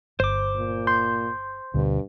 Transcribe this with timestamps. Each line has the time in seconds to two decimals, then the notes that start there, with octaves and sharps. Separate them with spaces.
0.20 G1 C5 D6
0.56 A#2
0.87 C6 G6
1.74 D2 G2 B2 D3